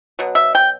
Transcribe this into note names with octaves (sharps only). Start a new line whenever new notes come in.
B2 F#3
E5
G5